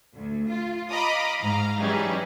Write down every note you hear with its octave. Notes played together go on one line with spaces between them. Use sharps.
D2
F4
D#5 F5 A#5 B5 D6 D#6
G#2 F5 A#5
E3 F#3 G3 C#4 D#4 G#4